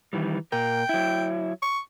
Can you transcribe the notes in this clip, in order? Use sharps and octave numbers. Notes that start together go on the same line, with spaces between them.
D#3 E3 G3
A#2 A#4 G5
F#3 E4
C#6